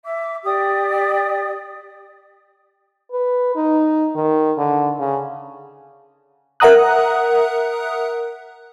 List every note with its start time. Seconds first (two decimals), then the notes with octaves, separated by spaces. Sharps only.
0.04 E5 D6
0.44 G4 D5 D#6
3.12 B4
3.55 D#4
4.16 D#3
4.58 D3
4.98 C#3
6.60 A#4 E5 F#5 A#5 D#6 F#6